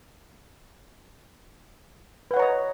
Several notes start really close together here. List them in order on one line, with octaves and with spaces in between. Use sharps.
B4 F#5 C#5 A#5 D#5